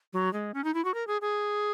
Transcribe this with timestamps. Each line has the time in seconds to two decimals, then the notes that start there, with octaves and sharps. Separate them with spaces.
0.13 F#3
0.33 G#3
0.54 C#4
0.64 D#4
0.74 E4
0.85 F#4
0.94 A#4
1.07 G#4
1.21 G#4